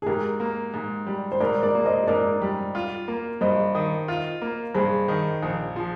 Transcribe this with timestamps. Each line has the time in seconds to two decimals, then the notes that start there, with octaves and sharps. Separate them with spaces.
0.02 G#4
0.06 G#2 G4 A#4
0.40 A#3
0.74 G#2
1.07 G3
1.32 C5
1.40 G#2 A#4 D5
1.63 A#4 D5
1.75 A#3
1.85 C5 D#5
2.07 G#2 A#4 D5
2.42 G3
2.75 F4
3.08 A#3
3.41 G2 C5 D#5
3.75 D#3
4.08 F4
4.42 A#3
4.75 G2 G#4 C5
5.08 D#3
5.43 A#1
5.76 F3